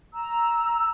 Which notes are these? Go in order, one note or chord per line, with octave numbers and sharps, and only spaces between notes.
A#5 E6